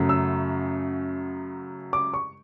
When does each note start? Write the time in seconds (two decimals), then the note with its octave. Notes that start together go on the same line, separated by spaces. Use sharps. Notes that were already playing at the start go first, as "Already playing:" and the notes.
Already playing: F#2 C#3 F#3 A3
0.09 E6
1.93 D6
2.14 C#6